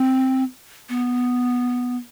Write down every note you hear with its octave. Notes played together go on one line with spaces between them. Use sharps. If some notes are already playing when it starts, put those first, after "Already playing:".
Already playing: C4
B3